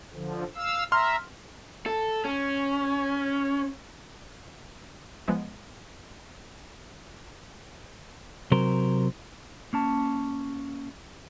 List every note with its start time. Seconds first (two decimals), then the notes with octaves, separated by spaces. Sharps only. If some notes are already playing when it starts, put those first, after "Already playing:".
0.13 D3 F3
0.55 F5 E6
0.92 E5 A#5 C6 F6
1.86 A4
2.25 C#4
5.28 F3 G#3 B3 B4 D#5
8.52 C3 F#3 A#4 C5
9.73 A#3 C#4 A5